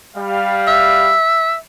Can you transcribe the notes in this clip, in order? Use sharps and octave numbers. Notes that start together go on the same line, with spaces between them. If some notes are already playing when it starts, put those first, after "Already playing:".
G3 F5
E5